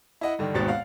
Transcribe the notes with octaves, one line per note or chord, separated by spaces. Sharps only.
E4 D#5 F#5
G2 D3 D#3
G#1 D#2 G#2 B2 C4 A6
F5 F#5